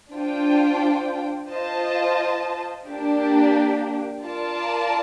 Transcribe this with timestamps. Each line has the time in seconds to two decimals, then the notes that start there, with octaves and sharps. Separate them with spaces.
0.11 D4 F4 C5 G5
1.49 F4 C5 D#5 A5
2.87 A#3 D4 G4
4.24 F4 A#4 D5 A5